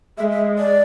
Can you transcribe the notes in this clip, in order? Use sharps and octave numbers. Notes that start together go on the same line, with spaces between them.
G#3 E5
E5
D5